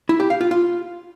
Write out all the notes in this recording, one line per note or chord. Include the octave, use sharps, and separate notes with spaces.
E4
G4
F5
F4
F4